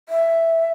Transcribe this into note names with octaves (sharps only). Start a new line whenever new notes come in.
E5